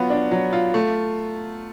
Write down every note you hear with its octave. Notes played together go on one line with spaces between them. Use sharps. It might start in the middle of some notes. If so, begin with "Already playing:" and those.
Already playing: F#3 B3 F4
D4
F#3
F4
A3